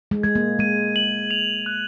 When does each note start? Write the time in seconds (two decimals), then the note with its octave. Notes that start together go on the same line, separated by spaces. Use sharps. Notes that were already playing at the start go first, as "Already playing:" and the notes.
0.11 G#3
0.23 G#3 G#6
0.35 A#3
0.59 G#3 D#7
0.96 F#7
1.31 F7
1.66 F#6